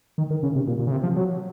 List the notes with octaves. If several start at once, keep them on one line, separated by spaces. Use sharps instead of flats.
D#3
D#3
C#3
C3
A#2
A#2
C#3
C3
F3
F#3